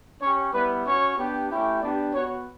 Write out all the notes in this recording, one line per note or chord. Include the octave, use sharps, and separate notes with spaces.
C#4 G4 C#5
G3 B3 E4 B4
C#4 F#4 C#5
B3 D4 G4
A3 C#4 E4 G4
B3 D4 G4 D5
B3 F#4 C#5